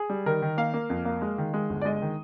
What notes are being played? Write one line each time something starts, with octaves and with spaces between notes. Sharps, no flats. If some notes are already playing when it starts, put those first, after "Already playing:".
Already playing: G#4
G3
D#3 A#4
D#3
A#3 F5
A#3
F2
A#3
G#3
D#3
G#3
G1
D5
G#3 D#5
D#3